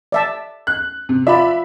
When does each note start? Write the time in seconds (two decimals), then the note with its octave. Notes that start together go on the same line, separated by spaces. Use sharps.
0.12 D5 E5 A5
0.67 F#6
1.09 C3
1.27 F4 D5 E5 B5